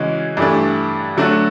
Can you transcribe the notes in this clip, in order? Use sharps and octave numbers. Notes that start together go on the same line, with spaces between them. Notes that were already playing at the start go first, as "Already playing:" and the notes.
Already playing: C#3 E3 G#3 C#4 F#4
G2 E3 A3 D4
D3 F#3 A3 D4 F#4